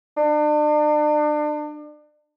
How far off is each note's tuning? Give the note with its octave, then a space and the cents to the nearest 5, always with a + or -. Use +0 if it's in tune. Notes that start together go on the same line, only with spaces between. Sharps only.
D4 +35